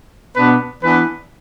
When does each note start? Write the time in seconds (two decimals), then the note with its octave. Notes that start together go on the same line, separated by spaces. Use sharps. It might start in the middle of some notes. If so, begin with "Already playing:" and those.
0.36 B2 B3 D4 B4
0.83 E3 B3 D4 B4